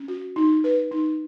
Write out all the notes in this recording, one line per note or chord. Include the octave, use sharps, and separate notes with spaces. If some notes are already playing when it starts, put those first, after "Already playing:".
Already playing: C#4
F#4
D#4
B4
D#4